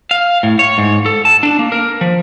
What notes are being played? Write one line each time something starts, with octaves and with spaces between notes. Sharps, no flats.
F5
A2
C#5
G#2
A4
A5
D4
A#3
A#4
F3